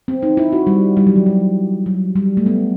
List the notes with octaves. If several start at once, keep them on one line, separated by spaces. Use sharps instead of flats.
C4
D#4
E4
F#4
G3
G3
F#3
E3
F#3
F#3
G3
A3
B3